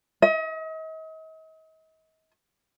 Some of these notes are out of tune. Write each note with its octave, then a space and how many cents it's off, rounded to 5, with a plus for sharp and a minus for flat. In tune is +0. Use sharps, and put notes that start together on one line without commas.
D#5 +40